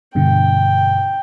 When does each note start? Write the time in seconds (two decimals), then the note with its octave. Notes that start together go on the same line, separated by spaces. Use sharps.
0.15 G2 B2 D3 G5